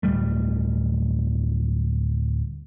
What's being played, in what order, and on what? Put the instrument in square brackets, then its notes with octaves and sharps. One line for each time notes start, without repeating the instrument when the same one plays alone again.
[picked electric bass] D1 G3 A3